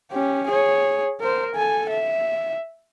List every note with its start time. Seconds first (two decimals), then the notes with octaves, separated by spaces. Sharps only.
0.12 C#4 G4
0.48 G#4 C#5
1.21 A#4 C5
1.56 A4 G#5
1.90 E5